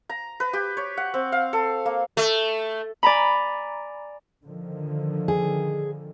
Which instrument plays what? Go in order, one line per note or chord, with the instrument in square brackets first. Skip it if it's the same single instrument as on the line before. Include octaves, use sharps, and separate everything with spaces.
[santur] A#5
B4
G4
C#5
F#5
C4
F5
A4
A#3
[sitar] A3
[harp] D5 G#5 A#5 B5
[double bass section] D3 D#3 F3
[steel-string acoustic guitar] G#4